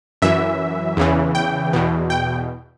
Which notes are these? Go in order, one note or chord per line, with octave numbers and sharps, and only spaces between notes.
F#2 E3 E5
E2 C#3 E3
G5
E2 B2
G5